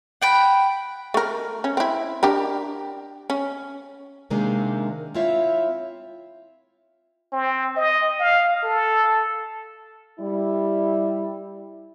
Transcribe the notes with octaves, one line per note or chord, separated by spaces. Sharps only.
F#5 G5 B5
A3 A#4
C#4
C4 E4
D4 G4 A#4
C#4
C3 D#3 G#3 A#3 C4 D4
C4 E4 F4 C#5 E5
C4
D#5
F5
A4
G3 E4